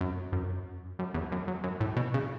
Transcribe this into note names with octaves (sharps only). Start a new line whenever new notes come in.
F#2
F#2
F#2
E2
F#2
F#2
F#2
A2
B2
C#3